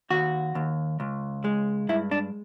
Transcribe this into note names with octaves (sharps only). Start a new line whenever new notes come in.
D#2 F#4
D#2
C#2
G#3
G2 E4
D4